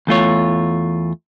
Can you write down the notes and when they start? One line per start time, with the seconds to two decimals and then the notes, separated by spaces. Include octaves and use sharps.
0.07 E2 A3 F4 C#5